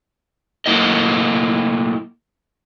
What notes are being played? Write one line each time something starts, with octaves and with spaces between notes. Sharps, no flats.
F#3 A3 A#3 E4 A#4 D#5